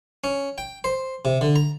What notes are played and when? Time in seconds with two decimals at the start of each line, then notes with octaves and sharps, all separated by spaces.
0.24 C#4
0.58 G5
0.84 C5
1.25 C3
1.41 D3
1.56 A#5